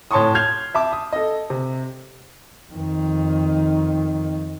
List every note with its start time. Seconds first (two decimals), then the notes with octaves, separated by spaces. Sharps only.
0.11 A2 C#5 A5 C6 C#6 D#6
0.35 F6 G6 G#6 C7 F7
0.74 E5 A5 D6
0.93 D#6
1.13 A4 D#5
1.50 C3
2.72 F2 D#3